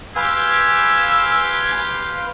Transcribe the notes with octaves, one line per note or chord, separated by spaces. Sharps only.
G4 B4 F5 G#5 C6 E6